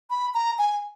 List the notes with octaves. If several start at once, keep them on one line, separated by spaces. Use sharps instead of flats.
B5
A#5
G#5